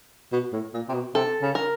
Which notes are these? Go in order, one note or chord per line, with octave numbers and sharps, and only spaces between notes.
B2
A2
A#2
C3
B2
C3 A4
C#3
A#4